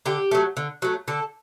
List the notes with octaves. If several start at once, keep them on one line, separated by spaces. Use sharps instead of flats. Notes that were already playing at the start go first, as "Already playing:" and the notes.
D3 G4
F#3 A3
D3
F#3 A3
D3 A4